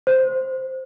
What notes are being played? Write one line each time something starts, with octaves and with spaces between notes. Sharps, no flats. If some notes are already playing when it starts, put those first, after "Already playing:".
C5